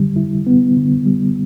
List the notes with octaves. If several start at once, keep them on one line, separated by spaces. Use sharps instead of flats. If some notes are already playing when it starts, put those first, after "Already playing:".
Already playing: D3 G3
E4
B3
D3
G3